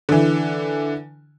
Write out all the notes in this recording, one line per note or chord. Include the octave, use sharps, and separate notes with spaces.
D3 E3